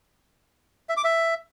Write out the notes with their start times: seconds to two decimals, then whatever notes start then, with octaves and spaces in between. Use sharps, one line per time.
0.89 E5
0.97 D6
1.04 E5